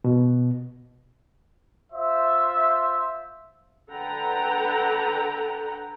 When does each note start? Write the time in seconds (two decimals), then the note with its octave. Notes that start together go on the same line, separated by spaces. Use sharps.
0.04 B2
1.93 F4 C5 E5
3.91 D3 A4 B4 F#5 G5 A#5